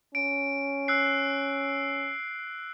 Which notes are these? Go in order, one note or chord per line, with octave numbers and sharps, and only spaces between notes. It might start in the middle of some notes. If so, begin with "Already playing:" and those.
C#4 D7
E6 F#6 C7